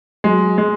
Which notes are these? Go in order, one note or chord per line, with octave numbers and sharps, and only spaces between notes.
F#3 G#3
G#3